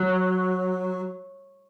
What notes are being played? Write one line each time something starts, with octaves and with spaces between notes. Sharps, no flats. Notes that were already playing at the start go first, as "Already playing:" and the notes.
Already playing: F#3